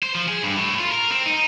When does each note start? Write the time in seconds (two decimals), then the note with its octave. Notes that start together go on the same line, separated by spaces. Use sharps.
0.03 C5
0.15 F3
0.28 G#4
0.43 G2
0.57 A2
0.79 F4
0.92 A#4
1.11 C4
1.26 D#4